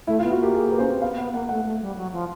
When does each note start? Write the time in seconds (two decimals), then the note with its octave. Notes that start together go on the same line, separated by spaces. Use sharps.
0.07 A3 E4
0.19 F4
0.23 B3
0.31 F#4
0.39 A#3 G4
0.55 G#4
0.71 B4
0.78 C#4 C5
0.92 C4
1.02 B3 F5
1.18 B3 F#5
1.34 A#3 F#5
1.49 A3 F#5
1.65 A3
1.81 G3
1.97 F#3
2.13 F3